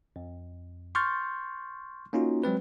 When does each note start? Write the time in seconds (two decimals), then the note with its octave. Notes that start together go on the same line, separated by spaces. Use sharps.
0.16 F2
0.95 C6 C#6 F6 G6 A6
2.13 A#3 C#4 D#4 F4 F#4
2.44 F#3 G#3 C4 B4